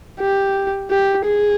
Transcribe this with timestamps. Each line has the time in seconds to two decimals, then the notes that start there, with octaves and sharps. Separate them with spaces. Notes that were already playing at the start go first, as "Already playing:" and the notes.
0.20 G4
0.91 G4
1.25 G#4